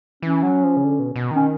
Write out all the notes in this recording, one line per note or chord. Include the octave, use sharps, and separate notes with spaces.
E3 C#4
F#3
F3
C#3
D3
B2
B2
D#3 C#4